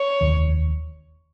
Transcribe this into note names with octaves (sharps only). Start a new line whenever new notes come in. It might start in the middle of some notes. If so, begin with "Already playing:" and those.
Already playing: C#5
F1 D#2 D#3